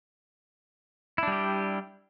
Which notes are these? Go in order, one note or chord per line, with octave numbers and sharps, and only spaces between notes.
G3 D4 E4 G4